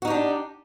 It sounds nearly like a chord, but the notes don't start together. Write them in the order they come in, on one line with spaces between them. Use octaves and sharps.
F#4 D#4 G4 D4